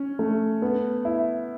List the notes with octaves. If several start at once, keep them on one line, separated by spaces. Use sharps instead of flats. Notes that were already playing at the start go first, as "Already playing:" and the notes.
Already playing: C#4
A3
B3
E4